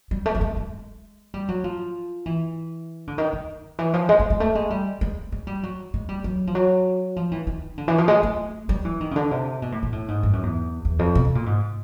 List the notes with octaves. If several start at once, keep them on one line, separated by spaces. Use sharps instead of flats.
G3
A3
G3
G#3
G#3
G3
F#3
F3
E3
D3
D#3
D#3
E3
F3
G#3
G#3
G#3
A3
G#3
G3
G#3
G#3
G3
F#3
G#3
G3
F#3
F3
F#3
F3
E3
D#3
D3
E3
F3
G#3
A3
G3
E3
D#3
C#3
D3
C3
B2
A2
A#2
A2
G#2
G2
F#2
E2
E2
F2
B2
C3
A#2
G#2